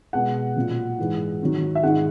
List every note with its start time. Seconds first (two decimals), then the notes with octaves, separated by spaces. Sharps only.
0.13 B2 G#3 F#5
0.56 A#2 F#3
0.99 G#2 E3 G#3
1.41 G#2 D#3 F#3
1.75 E5
1.83 G#2 D#3 G#3 F#5